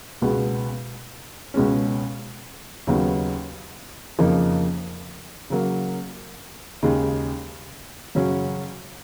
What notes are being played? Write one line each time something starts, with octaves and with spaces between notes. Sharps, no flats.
C#2 B2 G#3 B3
C#2 B2 G#3 C#4
D#2 C#3 F#3 B3 D#4
F2 C#3 F3 A#3 D#4
C#3 F#3 A#3
D#2 C#3 G#3 D#4 G#4
F#2 C#3 F#3 C#4